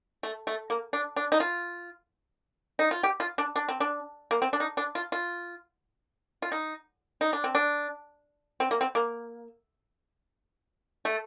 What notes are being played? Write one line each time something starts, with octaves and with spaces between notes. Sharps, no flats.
A3
A3
A#3
D4
D4
D#4
F4
D#4
F4
G4
F4
D4
D4
C4
D4
A#3
C4
D4
D#4
D4
F4
F4
F4
D#4
D#4
D4
C4
D4
C4
A#3
C4
A#3
A3